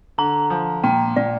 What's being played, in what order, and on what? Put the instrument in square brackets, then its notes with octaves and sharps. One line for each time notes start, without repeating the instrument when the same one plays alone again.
[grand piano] D3 [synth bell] A#5
[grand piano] F3
[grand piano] A#2 [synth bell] G5
[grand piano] A#2 [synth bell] D5